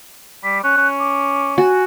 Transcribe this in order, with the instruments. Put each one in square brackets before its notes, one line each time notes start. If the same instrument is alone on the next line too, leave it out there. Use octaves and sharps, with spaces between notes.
[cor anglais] G3 [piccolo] B6
[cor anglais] C#4 [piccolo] F#6
[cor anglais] C#4
[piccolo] D6
[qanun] F#4 [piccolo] G#5